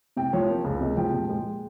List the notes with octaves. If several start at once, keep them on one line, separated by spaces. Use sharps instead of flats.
C3 G5
F3 C#5
A#3
C#2 F5
C3 D#5
F3 G5
A#2
G#3